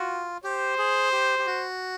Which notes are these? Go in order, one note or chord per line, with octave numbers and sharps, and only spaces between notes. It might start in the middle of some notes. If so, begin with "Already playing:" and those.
Already playing: F4 F#4
G4 C5
G#4
G4
G4
F#4